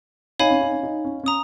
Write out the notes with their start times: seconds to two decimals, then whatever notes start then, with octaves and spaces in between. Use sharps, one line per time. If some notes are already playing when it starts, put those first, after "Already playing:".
0.40 D#4 C#5 F5 G#5 B5
0.51 C#4
0.61 D#4
0.72 C#4
0.83 D#4
1.05 C#4
1.24 C#4 A#5 D#6